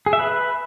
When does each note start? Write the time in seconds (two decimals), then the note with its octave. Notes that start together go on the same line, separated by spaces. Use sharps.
0.06 G#4
0.13 E5
0.19 B4